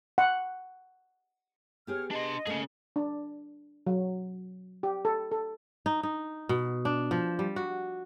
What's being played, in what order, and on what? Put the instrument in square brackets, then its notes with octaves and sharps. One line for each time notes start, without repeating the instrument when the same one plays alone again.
[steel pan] F#5
[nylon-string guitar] B3 G4 G#4 [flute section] C#5 F6
[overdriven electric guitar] D4 C6 [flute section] D#5
[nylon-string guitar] A3 A#3 [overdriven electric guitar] C#4 G#4
[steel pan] D4
F#3
G4
A4
A4
[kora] D#4
D#4
B2
D4
F3
G3
F#4